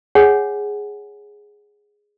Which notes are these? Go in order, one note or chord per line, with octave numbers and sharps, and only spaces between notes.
G#4 C#5 F#5 G#5